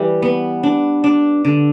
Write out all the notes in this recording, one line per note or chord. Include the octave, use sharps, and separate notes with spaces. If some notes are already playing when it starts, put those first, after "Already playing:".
Already playing: E3 G3
B3
D4
D4
D3